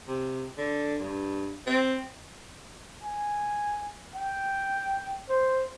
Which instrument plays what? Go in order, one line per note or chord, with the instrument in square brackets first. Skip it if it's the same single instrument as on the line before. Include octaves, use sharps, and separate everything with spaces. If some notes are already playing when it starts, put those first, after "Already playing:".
[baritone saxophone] C3
D3
G2
C4
[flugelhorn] G#5
G5
C5